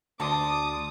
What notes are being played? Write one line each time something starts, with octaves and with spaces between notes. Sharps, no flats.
D2 D5 A5 C6 D6 D#6